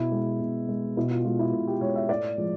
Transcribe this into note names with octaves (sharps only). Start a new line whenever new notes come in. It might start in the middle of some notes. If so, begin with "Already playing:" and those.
Already playing: B2 E4
G#3
B2
G#3
B2 E4
F4
G#3 F4
E4
B2
G4
G#3 C#5
E5
A2 D5
F3 G#3